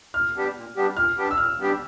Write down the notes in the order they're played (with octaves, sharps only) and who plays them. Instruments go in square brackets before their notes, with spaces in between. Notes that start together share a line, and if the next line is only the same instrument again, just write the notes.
[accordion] A#2 [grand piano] F6
[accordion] G3 B3 D4 G4
A#2
G3 B3 D4 G4
[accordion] A#2 [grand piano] F6
[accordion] G3 B3 D4 G4
[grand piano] E6
[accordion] A#2 [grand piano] F6
[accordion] G3 B3 D4 G4